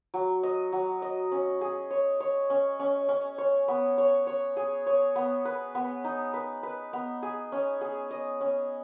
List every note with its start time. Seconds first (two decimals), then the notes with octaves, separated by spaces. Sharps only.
0.14 F#3
0.43 D#5
0.72 F#3
1.02 D#5
1.32 C#4
1.61 G#4
1.91 C#5
2.20 C#5
2.50 C#4
2.79 C#4
3.09 C#4
3.38 C#5
3.68 B3
3.98 C#5
4.27 C#5
4.57 G#4
4.87 C#5
5.16 B3
5.45 B4
5.75 B3
6.05 D#4
6.34 B4
6.63 B4
6.93 B3
7.23 G#4
7.52 C#4
7.81 G#4
8.11 D#5
8.41 C#4